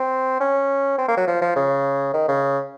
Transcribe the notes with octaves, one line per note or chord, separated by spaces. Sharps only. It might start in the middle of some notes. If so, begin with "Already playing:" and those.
Already playing: C4
C#4
C4
A#3
F#3
F3
F3
C#3
D#3
C#3